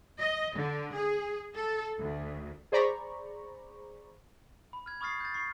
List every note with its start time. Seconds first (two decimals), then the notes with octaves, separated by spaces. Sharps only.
0.20 D#5
0.57 D3
0.95 G#4
1.57 A4
2.00 D2
2.72 G#4 C5 D5 A#5 B5 C#6
4.73 B5
4.86 F6 G#6
5.01 B5 C#6 D#6 F6 A6 C7
5.20 G6 A6
5.34 B5 C#6 C7